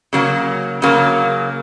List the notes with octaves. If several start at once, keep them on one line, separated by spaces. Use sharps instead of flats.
C#3 F#3 A#3
C#3 F#3 A#3